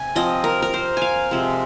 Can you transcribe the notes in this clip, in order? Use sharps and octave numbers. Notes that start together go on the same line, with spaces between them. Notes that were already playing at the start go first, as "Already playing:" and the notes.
Already playing: C3 G#5
F3 C4 D#5
A#4
A#4
C5
F5 G#5
C3 F3 G#3 C4